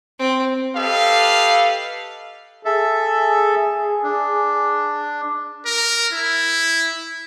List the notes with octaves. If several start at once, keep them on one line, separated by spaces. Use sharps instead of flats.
C4
G4 A4 B4 D#5 F5
G#4 A4 E5
D4
A#4
E4